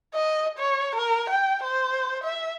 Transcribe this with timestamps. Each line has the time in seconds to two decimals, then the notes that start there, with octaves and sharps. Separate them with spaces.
0.14 D#5
0.58 C#5
0.95 A#4
1.30 G5
1.64 C5
2.24 E5